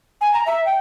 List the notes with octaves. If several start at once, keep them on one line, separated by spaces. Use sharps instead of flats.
G#5
A#5
E5
G5